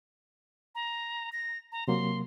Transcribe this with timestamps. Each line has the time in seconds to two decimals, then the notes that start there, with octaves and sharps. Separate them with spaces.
0.75 A#5
1.32 A#6
1.72 A#5
1.88 C3 F#3 A#3 C6